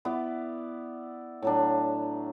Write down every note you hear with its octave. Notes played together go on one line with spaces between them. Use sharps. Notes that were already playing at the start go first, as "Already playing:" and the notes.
B3 E4 D5
A2 F#3 D4